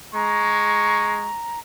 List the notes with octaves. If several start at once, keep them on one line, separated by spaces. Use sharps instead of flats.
G#3 A#5 C#6